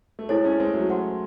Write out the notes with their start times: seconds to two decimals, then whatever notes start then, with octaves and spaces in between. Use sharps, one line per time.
0.19 A3
0.29 G#3 C4 E4 A4 C#5
0.45 A3 C#4
0.60 G#3 C4
0.74 F#3 A3
0.89 C5 F#5 C6